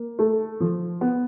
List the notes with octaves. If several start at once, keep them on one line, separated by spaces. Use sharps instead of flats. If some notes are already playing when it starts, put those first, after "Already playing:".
Already playing: A#3
A3
F3
B3